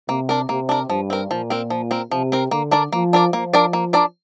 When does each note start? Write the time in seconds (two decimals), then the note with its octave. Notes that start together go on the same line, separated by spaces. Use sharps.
0.08 C3 A#3
0.29 D4 A#4
0.49 C3 A#3
0.69 D4 A#4
0.90 G2 F3
1.10 C4 A#4
1.30 A#2 F3
1.50 C4 A#4
1.70 F3
1.91 C4 A#4
2.11 C3 F3
2.32 C4 A#4
2.51 D3 A#3
2.71 D4 A#4 D5
2.93 F3 A#3
3.13 D4 A#4 D5
3.33 F3 A#3
3.53 D4 A#4 D5
3.73 A#3
3.93 D4 A#4 D5